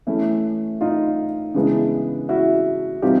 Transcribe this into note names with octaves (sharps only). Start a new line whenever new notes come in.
E3 A3 C#4 E4
D#4 F4
C#3 E3 G#3 B3 D4
E4 F#4
C3 E3 G3 C4 D#4 F4 G4